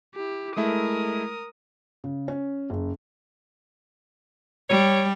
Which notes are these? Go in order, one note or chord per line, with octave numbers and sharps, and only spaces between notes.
E4 G4
G#3 A3 E4 A#4 D#6
C#3
C#4
F#1
G3 C#5